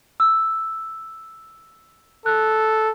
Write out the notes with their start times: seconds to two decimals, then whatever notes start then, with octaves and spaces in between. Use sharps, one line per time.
0.20 E6
2.26 A4 F#6